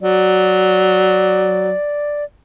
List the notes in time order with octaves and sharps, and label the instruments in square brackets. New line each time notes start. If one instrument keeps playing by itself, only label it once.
[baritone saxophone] F#3 [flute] D5